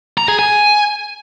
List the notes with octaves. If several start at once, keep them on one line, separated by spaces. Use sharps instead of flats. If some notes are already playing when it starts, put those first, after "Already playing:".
A#5
G#4
G#5